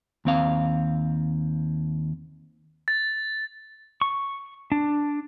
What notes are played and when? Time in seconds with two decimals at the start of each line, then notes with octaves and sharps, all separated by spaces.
0.25 D#2 C4 F5
2.88 A6
4.01 C#6
4.72 D4